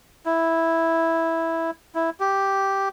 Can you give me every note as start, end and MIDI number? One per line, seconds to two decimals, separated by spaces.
0.26 1.71 64
1.95 2.10 64
2.20 2.89 67